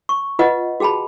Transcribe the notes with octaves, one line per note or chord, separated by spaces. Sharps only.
C#6
F4 B4 D#5 F#5
F#4 G#4 G5 A5 B5